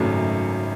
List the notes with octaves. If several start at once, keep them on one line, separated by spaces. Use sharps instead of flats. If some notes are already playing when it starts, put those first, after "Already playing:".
Already playing: G#1 F#2 C#3 F#3 A3